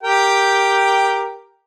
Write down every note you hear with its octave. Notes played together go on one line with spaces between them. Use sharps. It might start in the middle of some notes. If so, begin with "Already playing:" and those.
G4 A#4 G5